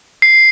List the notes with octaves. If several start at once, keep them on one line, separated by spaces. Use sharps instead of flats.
C7